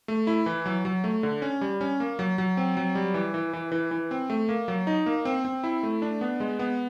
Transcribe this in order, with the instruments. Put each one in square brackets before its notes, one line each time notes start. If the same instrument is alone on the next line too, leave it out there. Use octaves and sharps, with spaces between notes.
[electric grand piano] A3
E4
E3
F#3
F#3
A3
D3
C#4
G3
C#4
A#3
F#3
F#3
C4
F#3
G3
E3
E3
E3
E3
E3
C4
A3
A#3
F#3
D#4
A#3
C4
C4
E4
A3
D4
B3
G#3
B3